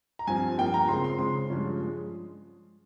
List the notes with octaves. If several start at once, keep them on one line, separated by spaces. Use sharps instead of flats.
A#5
G2 F3 C4 F4 G#5
G2 F3 A#3 G5
A#5
C#3 G#3 C4 F4 C6
C6
C#3 G#3 C4 C6
G2 F3 G#3 C#4 F4
F3 G#3